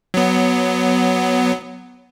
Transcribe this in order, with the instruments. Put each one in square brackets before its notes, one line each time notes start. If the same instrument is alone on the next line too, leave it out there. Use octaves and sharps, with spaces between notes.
[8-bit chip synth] F#3 B3